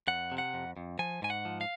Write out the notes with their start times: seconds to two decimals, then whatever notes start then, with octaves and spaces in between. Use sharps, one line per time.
0.07 F2 F#5
0.32 C3
0.38 F#5
0.54 F2
0.77 F2
0.99 F3 G#5
1.22 G#2 G#5
1.30 F#5
1.45 F3
1.61 F5